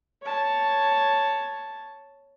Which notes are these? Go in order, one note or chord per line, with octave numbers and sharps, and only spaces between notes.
C#5 A5